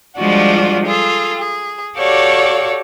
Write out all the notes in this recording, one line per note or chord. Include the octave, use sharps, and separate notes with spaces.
F3 G3 G#3 D4 F4 F#4
F4 G#4 A4
G#4
F#4 G4 A4 C#5 D5 F5